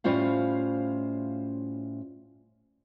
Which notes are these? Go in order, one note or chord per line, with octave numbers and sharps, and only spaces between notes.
A2 G3 C#4 F4 C5 F5